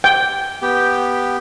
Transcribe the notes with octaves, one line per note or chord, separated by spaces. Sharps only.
G5
B3 G4